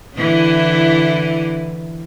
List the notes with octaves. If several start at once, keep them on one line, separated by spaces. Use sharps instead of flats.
D3 E3 E4